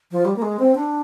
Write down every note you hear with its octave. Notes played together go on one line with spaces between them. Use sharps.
F3
G3
A#3
G#3
C4
D4